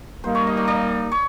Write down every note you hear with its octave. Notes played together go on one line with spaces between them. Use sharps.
G3 A#3 D#4 C5
C#5
D#5
D5
D5
C#5